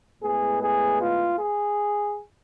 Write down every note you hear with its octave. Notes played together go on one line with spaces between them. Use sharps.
A2 G#3 B3 G#4
G#4
F4
G#4